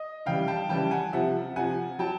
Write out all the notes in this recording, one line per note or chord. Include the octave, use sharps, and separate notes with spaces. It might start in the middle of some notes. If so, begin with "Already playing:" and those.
Already playing: D#5
C#3 E3 G3 F5 G5
G5 A5
C#3 E3 G3 G5 A5
F#5 G#5
C3 F3 E5 F#5
C3 F3 F#5 G#5
F#3 G5 A5